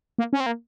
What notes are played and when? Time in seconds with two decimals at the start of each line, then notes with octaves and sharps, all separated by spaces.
0.18 A#3
0.33 C#4
0.40 C4
0.46 A#3